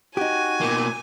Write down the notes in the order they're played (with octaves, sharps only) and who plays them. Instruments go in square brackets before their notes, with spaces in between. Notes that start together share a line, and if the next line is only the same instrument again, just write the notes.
[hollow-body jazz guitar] D#4 G4 [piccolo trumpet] F#4 [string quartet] G#5
[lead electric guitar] B2 A#3